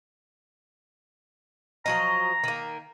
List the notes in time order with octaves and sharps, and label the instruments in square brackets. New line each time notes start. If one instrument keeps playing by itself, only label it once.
[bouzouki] F3 F#3 D#5 [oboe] A#5
[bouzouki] D#3 A#3